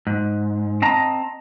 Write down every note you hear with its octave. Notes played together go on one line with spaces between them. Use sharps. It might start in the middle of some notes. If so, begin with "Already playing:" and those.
G#2
C4 D#5 A5 A#5